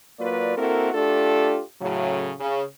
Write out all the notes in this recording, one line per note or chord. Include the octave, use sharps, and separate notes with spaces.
F#3 A#3 F4 B4 D5
A#3 C4 E4 F#4 A4 A#4
A3 D4 F4 G4 A4
A2 C#3 F#3
C#3